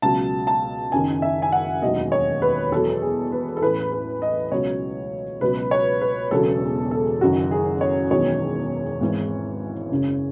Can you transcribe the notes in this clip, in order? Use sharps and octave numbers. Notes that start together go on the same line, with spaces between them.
C#2 B2 F#3 A5
A5
F#1 F#2 D#3 G#5
E5
G#5
F#5
E1 D#2 D#3 F#3 D#5
C#5
B4
E2 B2 F#3 A4
G#4
B4
A4
A1 A2 E3 B4
B4
D#5
C#2 B2 F#3 C#5
C#2 B2 F#3 B4
C#5
B4
E1 E2 C#3 F#3 A4
A4
F#1 F#2 D#3 F#3 F#4
G#4
C#5
E1 E2 D#3 F#3 C#5
G#1 G#2 E3
F#1 F#2 C#3